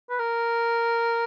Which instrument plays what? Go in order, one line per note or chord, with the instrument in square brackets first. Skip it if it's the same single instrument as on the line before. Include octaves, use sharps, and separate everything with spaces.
[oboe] B4
A#4